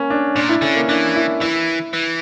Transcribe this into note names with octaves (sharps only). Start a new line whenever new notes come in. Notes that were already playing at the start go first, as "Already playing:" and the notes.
Already playing: A#3 C#4
D4
A#2 D4
E4
D3 C#4
A#3
E3 D4
E4
E3 E4
E3